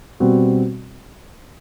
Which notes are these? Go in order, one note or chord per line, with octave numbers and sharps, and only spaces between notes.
B2 G3 C4 F#4